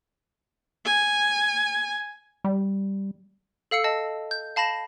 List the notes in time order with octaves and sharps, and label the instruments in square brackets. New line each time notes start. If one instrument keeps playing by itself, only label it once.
[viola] G#5
[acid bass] G3
[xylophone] A4 F5 E6 C#7
D#5 A5
G6
F5 A5 B5 A#6 E7